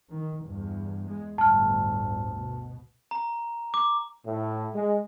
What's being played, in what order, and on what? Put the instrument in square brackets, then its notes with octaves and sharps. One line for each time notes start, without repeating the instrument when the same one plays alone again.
[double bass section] D#3
E2 G2
G#3
[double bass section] G1 D2 A2 [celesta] A5 F6
[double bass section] B2
[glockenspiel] A#5
D6
[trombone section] A2
G#3